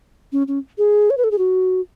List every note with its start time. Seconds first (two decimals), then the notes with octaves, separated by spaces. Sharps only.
0.32 C#4
0.48 C#4
0.78 G#4
1.10 C#5
1.17 B4
1.24 A4
1.31 G#4
1.38 F#4